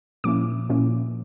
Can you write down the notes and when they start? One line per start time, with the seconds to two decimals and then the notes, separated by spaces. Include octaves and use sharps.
0.24 A#2 F3 A#3 C#4 E4 D6
0.69 A#2 F3 A#3 C#4 E4